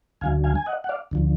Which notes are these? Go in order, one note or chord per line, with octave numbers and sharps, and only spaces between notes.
D2 D3 F#3 F5 G#5
F5 G#5
G#5
D#5 F#5
F#5
D5 F5
D2 D3 F3